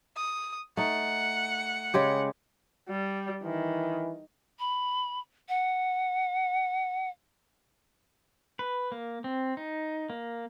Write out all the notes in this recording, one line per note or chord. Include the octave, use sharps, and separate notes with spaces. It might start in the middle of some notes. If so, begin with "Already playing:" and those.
D#6
A3 D#4 F#5
C#3 G#3 G4
G3
D#3 E3
B5
F#5
B4
A#3
C4
D#4
A#3